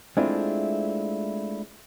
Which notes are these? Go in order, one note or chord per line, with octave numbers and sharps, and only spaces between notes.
G#3 A3 C4 D4 E4 F4